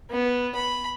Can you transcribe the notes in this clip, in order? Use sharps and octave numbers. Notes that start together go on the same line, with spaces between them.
B3
B5